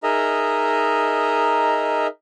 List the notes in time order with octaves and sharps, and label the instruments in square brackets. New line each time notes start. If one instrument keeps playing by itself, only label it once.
[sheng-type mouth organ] D#4 G#4 A#4 D#5 E5 A#5